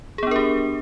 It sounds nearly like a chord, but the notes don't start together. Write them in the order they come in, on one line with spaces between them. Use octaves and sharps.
G#4 B3 D4 A#4 G4